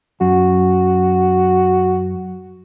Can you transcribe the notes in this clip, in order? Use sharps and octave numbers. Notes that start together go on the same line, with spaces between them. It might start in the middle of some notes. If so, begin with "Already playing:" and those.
F#2 F#4